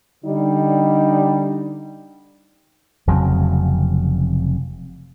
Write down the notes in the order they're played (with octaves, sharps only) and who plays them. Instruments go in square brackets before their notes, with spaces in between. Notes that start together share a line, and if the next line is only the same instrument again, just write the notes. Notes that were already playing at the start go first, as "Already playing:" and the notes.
[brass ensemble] D3 G3 D#4
[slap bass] F1 F2 C#3 F#3